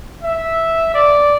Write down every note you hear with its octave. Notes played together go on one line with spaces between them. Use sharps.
E5
D5